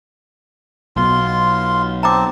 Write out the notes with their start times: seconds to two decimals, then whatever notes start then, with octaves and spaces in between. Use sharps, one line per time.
0.96 B1 B2 F4 C6
2.03 C4 A5 A#5 D6